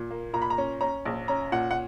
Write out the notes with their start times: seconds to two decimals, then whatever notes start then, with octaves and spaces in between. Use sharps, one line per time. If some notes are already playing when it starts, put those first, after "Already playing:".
Already playing: A#2
0.11 A#3
0.33 A#2 A#5
0.42 B5
0.50 A#5
0.58 C#4
0.81 C#4 A#5
1.05 A#1
1.28 C#4 A#5
1.52 A#2 F#5
1.71 F#5